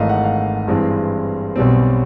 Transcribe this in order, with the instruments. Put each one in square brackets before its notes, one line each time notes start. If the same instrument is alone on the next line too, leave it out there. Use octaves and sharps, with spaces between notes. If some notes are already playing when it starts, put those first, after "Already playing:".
Already playing: [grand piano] G#1 G#2 E3 A3 D#5 F5
F#5
F5
G2 E3 G#3 C4
B1 B2 G3 C4